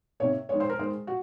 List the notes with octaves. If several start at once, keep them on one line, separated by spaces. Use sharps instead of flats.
C3 D#3 A#3 C#5
D#3 G#3 C#5
C5
A#4
D#3 G#3 C5
F#4